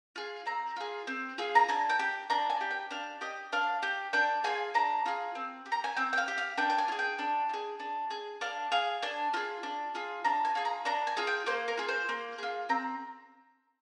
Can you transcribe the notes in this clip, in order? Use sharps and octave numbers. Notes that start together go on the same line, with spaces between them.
F4 G#4
C4 A#5
F4 G#4
C4
F4 G#4
A#5
D4 G#5
G5
G4
D4 A#5
G#5
G4
G5
D4 F5
G4 D#5
D4 F5
G4
D4 G5
F4 G#4 G#5
D4 A#5
F4 G#4
C4
G4
A#5
G#5
C4 G5
G5
F5
G4
F5
D4 G5
G5
G#5
F4
G#4
G5
D4
F4
G#4
D4
G#4
D4 F5
G#4 F5
D4 G#5
F4 G#4
D4
F4 G#4
D4 A#5
G#5
F4 G#4
A#5
D4 A#5
G#5
F4 G#4
G5
A#3 C5
A#4
F4 G#4
C5
A#3
F4 G#4
C4 A#5